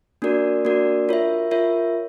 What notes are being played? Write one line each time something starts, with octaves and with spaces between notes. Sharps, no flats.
A#3 D4 F#4 A#4 D5
A#3 D4 F#4 A#4 D5
F4 A#4 C#5 E5
F4 A#4 C#5 E5